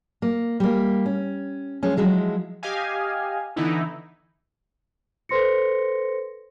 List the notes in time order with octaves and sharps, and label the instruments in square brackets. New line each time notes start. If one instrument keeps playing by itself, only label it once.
[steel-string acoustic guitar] A#3
G3 A#3
C#4
F3 G#3 C#4
F3 F#3 G#3 E4
[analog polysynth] G4 D#5 F5 G#5
D3 E3 B3 D#4 E4
[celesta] A4 B4 C5 C6 A#6 C#7